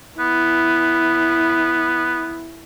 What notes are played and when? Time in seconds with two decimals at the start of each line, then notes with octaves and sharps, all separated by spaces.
0.19 B3 E4